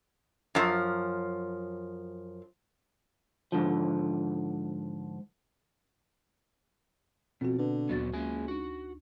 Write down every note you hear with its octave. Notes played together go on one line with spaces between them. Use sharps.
F#2 F3
G#2 D3 F3
F2 B2 C4 F#4
D3 B4
D2 A#2 F#3 B3 F#4 A6
C#2 A#3 G#4 G#5
D4 D#4 F#4